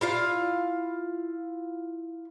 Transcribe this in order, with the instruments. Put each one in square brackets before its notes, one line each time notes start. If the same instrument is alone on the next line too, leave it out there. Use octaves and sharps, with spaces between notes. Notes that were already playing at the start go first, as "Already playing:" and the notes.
[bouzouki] E4 F4 F5